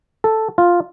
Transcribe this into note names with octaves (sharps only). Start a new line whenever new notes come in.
A4
F4